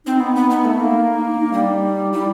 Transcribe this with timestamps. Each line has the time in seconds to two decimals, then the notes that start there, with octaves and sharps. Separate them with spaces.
0.06 C4 D#4
0.20 B3
0.36 B3
0.50 B3
0.65 A3 D#4
0.80 A#3
1.24 D#4
1.35 D4
1.39 D#4
1.47 D4
1.53 G3 D#4
2.12 G3 E4